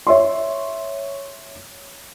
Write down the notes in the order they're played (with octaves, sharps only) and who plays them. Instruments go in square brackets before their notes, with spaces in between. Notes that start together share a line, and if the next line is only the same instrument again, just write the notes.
[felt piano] C#5 E5 C6